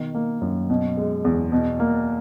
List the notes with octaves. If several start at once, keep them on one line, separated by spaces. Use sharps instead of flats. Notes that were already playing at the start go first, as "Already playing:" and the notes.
Already playing: B2 D#3
A#3
F#2
B2
G#3
E2
B2
A#3